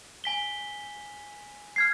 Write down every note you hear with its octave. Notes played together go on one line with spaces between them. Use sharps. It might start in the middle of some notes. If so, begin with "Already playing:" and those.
G#5 B6 G7
F6 G#6 C7